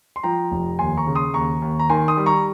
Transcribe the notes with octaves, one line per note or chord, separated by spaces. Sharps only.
C6
F3 G5 A#5
F1
D#2 G#5 C6
A#5 C#6
C#3
C6 D#6
D#2 A#5 C#6
D#2
A#5
D#3 G#5 C6
C6 D#6
G3
A#5 C#6